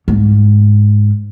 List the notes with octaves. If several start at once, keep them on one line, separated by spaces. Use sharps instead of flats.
G#2